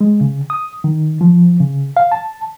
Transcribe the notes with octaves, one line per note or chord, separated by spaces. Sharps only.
G#3
C#3
D#6
D#3
F3
C#3
F5
A5